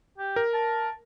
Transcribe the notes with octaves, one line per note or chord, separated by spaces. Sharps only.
G4
A#4
A5